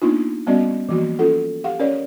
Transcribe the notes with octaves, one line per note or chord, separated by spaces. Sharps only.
A#3 B3 D4 D#4 F4
G3 B3 C#4 F#4 D5 D#5
E3 F3 A#3 F#4
C#4 F4 A4 F#5
G4 F5 F#5
C#4 A#4 C#5 D5